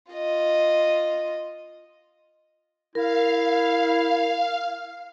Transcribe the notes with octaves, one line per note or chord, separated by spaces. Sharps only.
F4 D#5
E4 A#4 F5